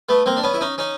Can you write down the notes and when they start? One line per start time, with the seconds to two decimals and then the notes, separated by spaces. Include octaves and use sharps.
0.09 A3 B3
0.26 A#3 C4
0.37 D4
0.44 B3 C#4
0.54 E4
0.61 C#4 D#4
0.78 C#4 D#4